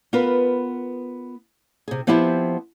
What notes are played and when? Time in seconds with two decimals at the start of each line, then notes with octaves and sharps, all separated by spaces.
0.13 B3 F4 A#4 B4
1.88 C3 G#4
2.07 F3 B3 C4 E4 G4 C5